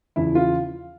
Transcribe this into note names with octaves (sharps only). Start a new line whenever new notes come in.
E2 C#3 F3 E4
F4